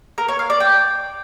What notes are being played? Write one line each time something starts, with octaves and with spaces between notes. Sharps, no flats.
A#4
C#5
F5
D5
G5